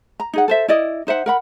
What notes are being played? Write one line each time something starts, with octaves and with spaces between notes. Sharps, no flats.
A#5
D#4 G#4 F#5
A4 C5 E5
E4 D5 D#5
D#4 C5 E5 F#5
A#4 F#5 B5